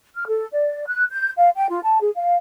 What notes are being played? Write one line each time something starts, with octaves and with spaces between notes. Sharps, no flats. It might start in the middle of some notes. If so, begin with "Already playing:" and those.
F6
A4
D5
F#6
G6
F5
G5
F4
A5
G#4
F5